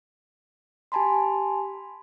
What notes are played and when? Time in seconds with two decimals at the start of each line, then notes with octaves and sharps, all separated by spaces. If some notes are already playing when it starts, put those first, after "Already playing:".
0.92 G4 G#5 A5 B5 C6